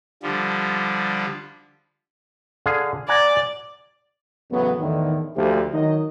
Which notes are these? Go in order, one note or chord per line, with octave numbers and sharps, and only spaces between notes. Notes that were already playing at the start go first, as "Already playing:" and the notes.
D3 F3 G3
D3 G#4 F5
D5 F#5 G#5 A#5
E2 A2 C#3 F#3 B3
E2 A2 D3 D#3
D2 F3 G4
D#3 F#3 D#4 D#5